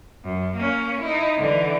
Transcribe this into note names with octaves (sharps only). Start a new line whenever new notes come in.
F#2
A#3 C#4
D#4 E4
D3 E3